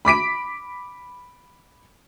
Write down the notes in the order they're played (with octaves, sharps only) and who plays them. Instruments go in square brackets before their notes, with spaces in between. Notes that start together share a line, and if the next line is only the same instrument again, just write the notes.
[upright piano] B5 D6 B6 D7